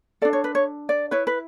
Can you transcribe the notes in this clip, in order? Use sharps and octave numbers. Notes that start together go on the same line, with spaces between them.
D4 A4 D5
C#5
B4
C#5
D5
E4 B4 C#5
B4